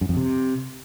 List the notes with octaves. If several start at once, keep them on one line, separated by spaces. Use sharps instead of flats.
F#2
F2
C3